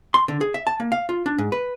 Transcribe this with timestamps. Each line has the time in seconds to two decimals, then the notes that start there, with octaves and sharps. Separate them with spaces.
0.14 C6
0.28 D3
0.41 G#4
0.54 E5
0.67 A5
0.80 A#3
0.92 F5
1.09 F4
1.26 D4
1.38 G#2
1.52 B4